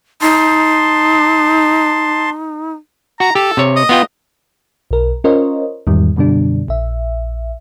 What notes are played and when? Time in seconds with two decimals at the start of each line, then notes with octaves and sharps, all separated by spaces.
0.21 D#4 A5 C6
3.20 F#4 A#5
3.35 G4 A4
3.57 C3 C#5
3.77 D#5
3.89 B3 F4 G5
4.91 B1 A#4
5.24 C#4 F4 A#4 C5 C#5 D#5
5.87 E2 G#2 D#3 G3
6.16 F#2 B2 D3 G3 D4
6.68 A#1 E5